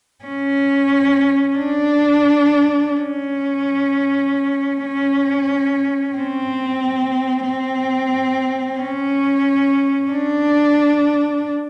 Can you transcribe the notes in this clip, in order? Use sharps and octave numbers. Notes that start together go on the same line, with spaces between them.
C#4
D4
C#4
C#4
C4
C4
C#4
D4